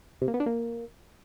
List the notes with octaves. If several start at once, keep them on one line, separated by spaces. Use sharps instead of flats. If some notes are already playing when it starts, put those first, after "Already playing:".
C3
A#3
B3
D4
A#3